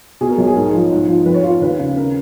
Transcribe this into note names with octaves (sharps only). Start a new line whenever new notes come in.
B2 G#4
A#4
B1
G#4
G#2 A#4
F3
G#2
F3
F2 B4
C#5
F3 F4
C#5
D#2 B4
C#3
C#3 A#4